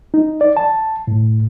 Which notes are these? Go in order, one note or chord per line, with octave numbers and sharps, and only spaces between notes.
D#4
D5
A5
A2